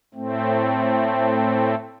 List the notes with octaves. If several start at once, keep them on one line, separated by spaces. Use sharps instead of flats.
A2 A3 C4